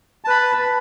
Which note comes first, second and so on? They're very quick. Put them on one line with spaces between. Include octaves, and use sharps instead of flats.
A5 B4 B5